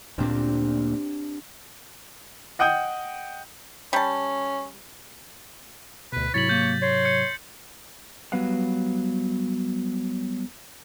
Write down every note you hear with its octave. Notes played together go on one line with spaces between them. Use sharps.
D2 A#2 A#3 C4 D4 G4
D#5 F#5 G5 D#6 G6
G3 C#4 A5
D2 B2 B4
G#2 C3 F#3 E4 C#5 A6 B6 F#7
A#3 G6
C#5 C6
G6 C#7
F#3 G3 B3 B4 F5 F#5